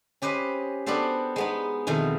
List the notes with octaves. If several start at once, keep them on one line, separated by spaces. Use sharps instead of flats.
C#4 G4 B4 C5 D#5
B3 D4 F#4 G4 A4 C5
G#3 B3 D#4
F2 B2 D#3 E3